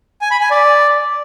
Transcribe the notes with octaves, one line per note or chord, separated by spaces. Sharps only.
G#5
B5
G#5
D5